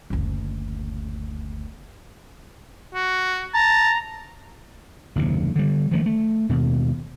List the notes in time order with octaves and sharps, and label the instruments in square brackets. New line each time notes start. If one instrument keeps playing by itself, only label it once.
[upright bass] F#1 D2
[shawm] F#4
[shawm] A5 [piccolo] A#5
[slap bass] F#1 D#2 C3
D3 G3
D#3 F3 F#3 A3
A3
D#2 B2